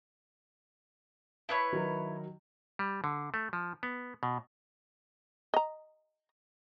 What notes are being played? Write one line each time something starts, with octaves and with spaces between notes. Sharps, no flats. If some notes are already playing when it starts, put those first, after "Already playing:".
E4 B4 C#5 A5
D#3 F#3 A#4
G3
D3
A3
F3
B3
B2
D#5 A#5